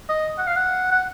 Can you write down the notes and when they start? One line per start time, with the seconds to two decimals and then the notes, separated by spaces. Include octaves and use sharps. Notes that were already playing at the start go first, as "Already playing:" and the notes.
0.09 D#5
0.38 F#5
0.47 F5
0.56 F#5
0.91 F#5